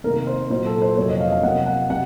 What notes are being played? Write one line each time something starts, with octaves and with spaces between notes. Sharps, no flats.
C3 D#3 A#3 A#4
C5
A#2 F#3 A#3 C5
A4
C5
F2 C3 F#3 A#3 C#5
D#5
F5
D#5
F5
C3 F#3 A#3 F#5
F#5
C3 F#5